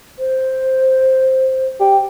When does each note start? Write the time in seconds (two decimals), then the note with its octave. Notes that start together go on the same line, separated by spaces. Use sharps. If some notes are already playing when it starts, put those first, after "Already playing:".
0.19 C5
1.80 G4